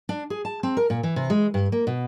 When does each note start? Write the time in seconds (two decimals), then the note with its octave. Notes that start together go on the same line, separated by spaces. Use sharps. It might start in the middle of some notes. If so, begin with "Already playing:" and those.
0.09 D4
0.30 G#4
0.45 A5
0.63 C4
0.77 A#4
0.90 A#2
1.03 E3
1.16 C3
1.30 G#3
1.54 G2
1.72 A#3
1.87 B2